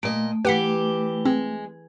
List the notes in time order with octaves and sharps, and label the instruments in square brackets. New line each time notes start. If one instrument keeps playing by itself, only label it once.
[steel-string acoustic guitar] A#2 D#5 [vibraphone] A3
[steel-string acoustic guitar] E3 G4 [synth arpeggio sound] B4 F#5 B6
[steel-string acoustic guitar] G#3 [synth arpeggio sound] C4